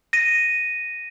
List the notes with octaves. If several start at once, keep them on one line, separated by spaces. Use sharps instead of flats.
A#6 D#7